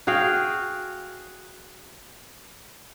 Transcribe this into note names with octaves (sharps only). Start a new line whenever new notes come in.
F#4 G#4 F5 G5